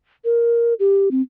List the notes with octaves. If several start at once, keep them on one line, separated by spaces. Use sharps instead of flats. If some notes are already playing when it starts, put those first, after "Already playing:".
A#4
G4
C4